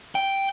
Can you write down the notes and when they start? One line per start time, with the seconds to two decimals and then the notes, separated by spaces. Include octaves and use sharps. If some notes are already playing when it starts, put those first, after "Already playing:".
0.15 G5